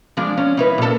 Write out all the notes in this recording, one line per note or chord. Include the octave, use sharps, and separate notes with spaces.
F3 G#3 D4
C#4
D#4 E4 B4
A#2 A4